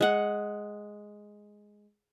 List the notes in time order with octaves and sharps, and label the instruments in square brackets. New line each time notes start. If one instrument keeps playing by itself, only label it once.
[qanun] G#3 F#5